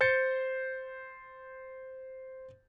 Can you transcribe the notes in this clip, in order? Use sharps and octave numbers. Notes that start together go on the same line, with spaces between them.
C5 G6 A6 C#7